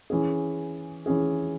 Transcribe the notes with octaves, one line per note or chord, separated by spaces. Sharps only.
E3 C#4 G#4
E3 C#4 G#4